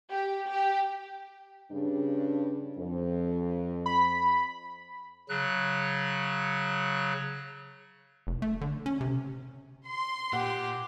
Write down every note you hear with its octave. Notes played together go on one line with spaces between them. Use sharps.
G4
G4
G2 C#3 D4
F2
B5
C#3 F#3 F#6
F1
A3
D3
C#4
C3
C6
A#2 G4 F#5